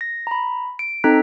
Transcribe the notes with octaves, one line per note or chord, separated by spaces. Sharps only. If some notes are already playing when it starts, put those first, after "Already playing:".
A#6
A#5 B5
D7
C4 D#4 A4 A#5 F#6 B6